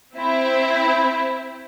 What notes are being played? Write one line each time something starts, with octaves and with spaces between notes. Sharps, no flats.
C4 E4